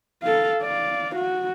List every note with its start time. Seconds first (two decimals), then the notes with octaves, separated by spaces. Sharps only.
0.23 A4 F5
0.62 D5 F5
1.15 F#4